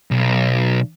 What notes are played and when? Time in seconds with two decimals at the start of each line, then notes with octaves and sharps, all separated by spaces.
0.11 B1